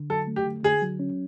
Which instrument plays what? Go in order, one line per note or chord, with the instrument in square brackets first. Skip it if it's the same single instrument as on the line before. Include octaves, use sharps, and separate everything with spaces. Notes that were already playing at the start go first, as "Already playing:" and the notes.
Already playing: [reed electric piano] D3
[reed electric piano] F#3 [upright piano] A4
[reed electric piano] A3
[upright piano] G4
[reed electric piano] D3
[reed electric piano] D3 [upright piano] G#4
[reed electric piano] F#3
C#4